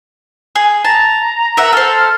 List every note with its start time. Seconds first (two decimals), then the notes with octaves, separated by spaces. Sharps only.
0.56 G#4
0.85 A5 A#5
1.57 A#4 E5 F#5
1.73 A4 C5 F6